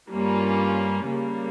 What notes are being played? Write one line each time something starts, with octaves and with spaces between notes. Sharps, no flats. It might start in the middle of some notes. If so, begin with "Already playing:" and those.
G2 G3 A#3 C#4 F4
C#3 G3 A#3